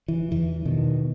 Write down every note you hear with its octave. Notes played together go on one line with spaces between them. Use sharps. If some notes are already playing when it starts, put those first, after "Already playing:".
E3
E2 E3
B2 D#3